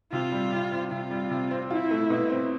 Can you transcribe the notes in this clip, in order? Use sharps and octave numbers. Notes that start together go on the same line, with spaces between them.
C3 F4
G3
C3
C4
C3 F4
G3
C3
C4
E4 F4
A3
B2
C4